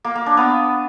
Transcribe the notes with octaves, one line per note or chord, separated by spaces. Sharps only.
A#3
A#3
D4
B3